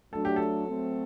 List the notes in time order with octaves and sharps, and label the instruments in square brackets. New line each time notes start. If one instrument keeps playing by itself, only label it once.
[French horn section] F#3 A3 D4 [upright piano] A4
[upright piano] G4
A4
[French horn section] F#3 A3 C4